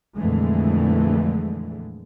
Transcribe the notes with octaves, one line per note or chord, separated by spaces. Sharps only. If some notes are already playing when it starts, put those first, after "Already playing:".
F2 A#2 D3 E3 G#3 A3